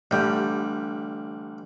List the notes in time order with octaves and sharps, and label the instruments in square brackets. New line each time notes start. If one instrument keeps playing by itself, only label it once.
[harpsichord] A1 G3 [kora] D3 G4